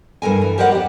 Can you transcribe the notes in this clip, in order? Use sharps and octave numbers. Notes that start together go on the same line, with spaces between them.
G2 A4 A#4 G#5
E3
G4 A#4 C5 D5 D#5 F#5
F2 G4